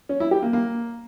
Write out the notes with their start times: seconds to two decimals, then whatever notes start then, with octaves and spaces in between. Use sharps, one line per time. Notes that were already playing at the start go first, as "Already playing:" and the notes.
0.09 C#4
0.20 E4
0.31 G4
0.42 A#3
0.53 A#3